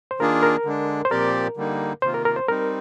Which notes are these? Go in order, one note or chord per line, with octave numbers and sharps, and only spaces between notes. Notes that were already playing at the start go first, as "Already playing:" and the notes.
C5
D#3 A#3 D4 F4 G#4 A#4
A#4
D3 G#3 D4
C5
A#2 F3 C4 G4 A#4 D5
D3 G3 A#3 D#4
C3 D#3 A#3 F4 C5
A#4
A#4
C5
G3 C4 D#4 A#4